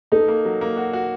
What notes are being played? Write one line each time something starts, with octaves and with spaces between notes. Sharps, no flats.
D#4 A4
A#3
F#3
A#3
F#4
F#4